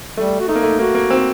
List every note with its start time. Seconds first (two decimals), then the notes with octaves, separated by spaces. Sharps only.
0.17 G3 A3
0.40 F#4
0.48 A3 D#4
0.56 A#3
0.63 A3
0.79 A#3 F#4
0.95 A#3
1.11 C4